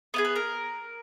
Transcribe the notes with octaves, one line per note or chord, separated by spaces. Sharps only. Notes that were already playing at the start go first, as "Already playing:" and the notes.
B3 E4 G#4 B4
B4
A#4